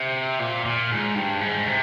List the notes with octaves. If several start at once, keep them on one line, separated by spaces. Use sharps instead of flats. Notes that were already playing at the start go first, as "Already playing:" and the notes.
Already playing: C3
A#2
A#2
G#2
G2
G#2
C3